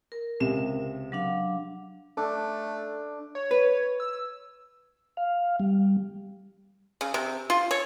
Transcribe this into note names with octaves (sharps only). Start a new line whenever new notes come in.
A#4
C#2 C3 E7
F#3 D4 F5
A3 D4
C#5
B4
E6
F5
G3
C#3
C3
F4
C#5